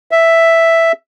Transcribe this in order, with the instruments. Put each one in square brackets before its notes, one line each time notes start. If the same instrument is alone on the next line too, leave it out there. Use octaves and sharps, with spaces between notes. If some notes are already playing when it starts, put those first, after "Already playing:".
[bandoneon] E5